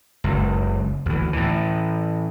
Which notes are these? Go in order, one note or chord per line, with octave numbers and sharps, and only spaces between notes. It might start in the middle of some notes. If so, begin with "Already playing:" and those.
F#1 C#2
D2 E3
A2 E3